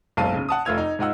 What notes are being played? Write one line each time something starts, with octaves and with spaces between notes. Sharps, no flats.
F#1 B1 G#2 F5 A5 D#7
C#3
F#5 A5 D#6
F1 A3 F4 E6 G#6 F7
D#4
G#2 D#4 F4 F#5 E6